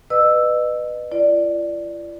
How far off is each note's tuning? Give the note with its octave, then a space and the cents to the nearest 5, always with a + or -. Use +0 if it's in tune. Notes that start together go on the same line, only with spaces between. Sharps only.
B4 +0 D#5 -35 E6 +0
F4 -45 D5 +0